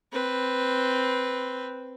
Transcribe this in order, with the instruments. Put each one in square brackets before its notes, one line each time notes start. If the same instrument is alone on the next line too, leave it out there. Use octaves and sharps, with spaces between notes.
[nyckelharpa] C4 B4